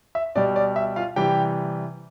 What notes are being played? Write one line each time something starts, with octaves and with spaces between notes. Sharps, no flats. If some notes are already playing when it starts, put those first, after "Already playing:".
E5
B2 G3 D5
D5
E5
F4 F5
C3 E3 G3 G4 G5